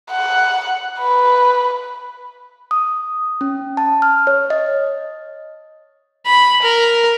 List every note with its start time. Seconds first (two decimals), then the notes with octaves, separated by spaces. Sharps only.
0.11 F#5
0.99 B4
2.71 D#6
3.41 C#4
3.77 A5
4.02 F6
4.27 C#5
4.50 D#5
6.26 B5
6.62 A#4